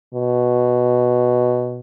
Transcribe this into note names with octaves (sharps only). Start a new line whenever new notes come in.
B2